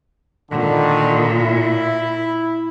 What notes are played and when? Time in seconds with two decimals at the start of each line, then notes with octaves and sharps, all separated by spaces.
0.51 A#2 D3 D#3
1.42 E4